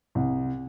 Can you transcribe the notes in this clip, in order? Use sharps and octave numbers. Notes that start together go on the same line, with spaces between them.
C2